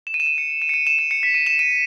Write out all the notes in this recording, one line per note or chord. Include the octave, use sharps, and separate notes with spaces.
E7
D#7
E7
D#7
C#7
D#7
D#7
C#7
D#7
E7
D#7
C#7
B6
D#7
E7
D#7